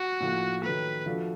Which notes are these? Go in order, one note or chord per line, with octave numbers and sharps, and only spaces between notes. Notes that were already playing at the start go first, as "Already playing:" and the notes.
Already playing: F#4
A2 F3 A#3
D#3 F#3 A3 B4
F3 A3 D4 F#4